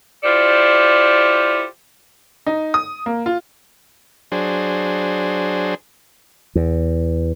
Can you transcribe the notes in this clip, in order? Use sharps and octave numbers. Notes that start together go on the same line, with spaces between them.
E4 F4 G4 A4 C5 D5
D#4
D#6
A#3
F4
F#3 D4 G#4 C5
E2